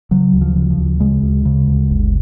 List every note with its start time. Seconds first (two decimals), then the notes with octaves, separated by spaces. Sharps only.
0.11 C#3 F#3
0.33 D2
0.41 F3
0.56 C#3
0.70 F3
0.77 D2
1.00 C#3 G#3
1.23 D2
1.45 C#3
1.67 D2
1.90 G1